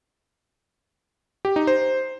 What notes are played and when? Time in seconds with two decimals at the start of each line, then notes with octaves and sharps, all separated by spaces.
1.45 G4
1.56 D#4
1.67 C5